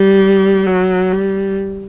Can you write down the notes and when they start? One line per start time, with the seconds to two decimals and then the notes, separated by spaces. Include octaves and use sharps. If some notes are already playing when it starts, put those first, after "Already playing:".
Already playing: G3
0.66 F#3
1.13 G3